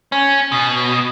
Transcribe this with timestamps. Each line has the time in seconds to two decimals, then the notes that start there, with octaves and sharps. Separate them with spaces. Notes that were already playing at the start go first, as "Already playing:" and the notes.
0.12 C#4
0.52 B2